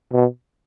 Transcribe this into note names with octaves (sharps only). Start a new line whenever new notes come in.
B2